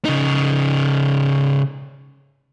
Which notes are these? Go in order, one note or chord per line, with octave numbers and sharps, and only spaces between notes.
C#3 D#4